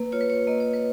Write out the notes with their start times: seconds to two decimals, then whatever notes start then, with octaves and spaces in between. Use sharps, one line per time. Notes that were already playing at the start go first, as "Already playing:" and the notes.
Already playing: A#3 B4
0.12 F4 C#5
0.21 B4
0.30 C#5
0.47 A#3 D#5
0.60 C#5
0.73 B4